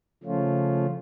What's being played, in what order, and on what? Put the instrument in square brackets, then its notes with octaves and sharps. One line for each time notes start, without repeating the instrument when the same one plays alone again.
[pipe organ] C#3 F3 A3 C#4 F4